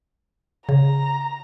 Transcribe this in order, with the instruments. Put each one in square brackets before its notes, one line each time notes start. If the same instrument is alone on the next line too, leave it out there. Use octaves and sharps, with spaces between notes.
[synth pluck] C#3 [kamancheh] A#5